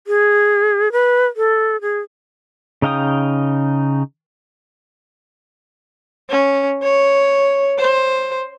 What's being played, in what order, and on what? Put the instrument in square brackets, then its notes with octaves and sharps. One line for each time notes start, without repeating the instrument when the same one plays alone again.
[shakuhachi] G#4
B4
A4
G#4
[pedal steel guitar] C#3 D#4 F5 G5 D#6
[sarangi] C#4
C#5
C5